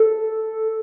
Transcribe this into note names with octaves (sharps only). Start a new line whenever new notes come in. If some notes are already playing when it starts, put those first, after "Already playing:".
Already playing: A4